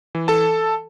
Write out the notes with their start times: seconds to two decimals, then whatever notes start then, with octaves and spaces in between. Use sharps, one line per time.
0.15 E3
0.28 A4 A5